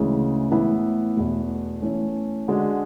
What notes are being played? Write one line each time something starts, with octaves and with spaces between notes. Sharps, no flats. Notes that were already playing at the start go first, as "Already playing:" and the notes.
Already playing: D2 C#3 E3 G#3
A2 E3 B3 E4
E2 B2 A3
E3 A3 C#4
D3 G#3 D4 F#4